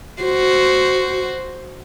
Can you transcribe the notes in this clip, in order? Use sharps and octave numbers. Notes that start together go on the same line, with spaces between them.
F#4 C5